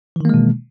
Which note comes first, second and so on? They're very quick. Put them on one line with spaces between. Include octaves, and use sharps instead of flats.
E3 D#3 A#3 G#3 B2